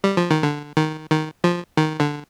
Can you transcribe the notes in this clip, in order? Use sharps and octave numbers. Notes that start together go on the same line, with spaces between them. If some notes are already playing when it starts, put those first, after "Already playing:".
G3
F3
D#3
D3
D#3
D#3
F3
D#3
D3